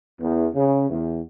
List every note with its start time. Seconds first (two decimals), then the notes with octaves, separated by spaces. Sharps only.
0.20 E2
0.54 C#3
0.90 E2